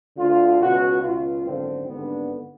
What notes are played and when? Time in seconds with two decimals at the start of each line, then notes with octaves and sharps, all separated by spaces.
0.17 D2 D3 F4
0.60 C#2 B2 F#4
1.02 C#2 B2 F4
1.44 G#1 F#2 D3 C4
1.87 G#1 G2 D3 B3